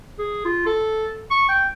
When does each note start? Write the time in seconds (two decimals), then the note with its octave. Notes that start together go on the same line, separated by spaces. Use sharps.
0.19 G#4
0.45 F4
0.66 A4
1.30 C#6
1.49 G5